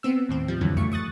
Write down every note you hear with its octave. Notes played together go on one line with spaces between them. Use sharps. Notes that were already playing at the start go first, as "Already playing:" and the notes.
B3 C4 E6
D#2 A2 C4
F3 G3
F2 D3 E3 F#3
C#2 F#2 A3 C#6
C#6 D#6 F#6 A6